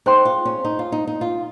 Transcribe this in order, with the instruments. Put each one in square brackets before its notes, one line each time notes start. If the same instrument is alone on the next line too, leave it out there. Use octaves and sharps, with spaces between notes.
[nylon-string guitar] D#4 [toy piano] G#4 C5 G5 C6
[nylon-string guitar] F4
C#4
D#4
F4
D#4
D#4
F4